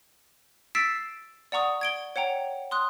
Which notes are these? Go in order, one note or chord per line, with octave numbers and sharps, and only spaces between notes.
E6 A6 B6 C7 D7 E7
D5 F#5 A#5 C#6 D#6
G#6 D7 G7
C#5 F#5 G5 A#5
C6 D#6 F#6